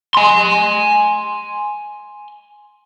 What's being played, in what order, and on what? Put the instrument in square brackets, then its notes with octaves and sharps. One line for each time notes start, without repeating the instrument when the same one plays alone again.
[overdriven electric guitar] G#5 C6